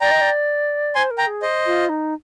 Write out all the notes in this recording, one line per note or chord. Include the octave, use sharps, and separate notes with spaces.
D5 G5 A#5
D#5
D5
C5 G#5 C6
A#4
G5 A#5
G#4
C5 D#5
F4
D#4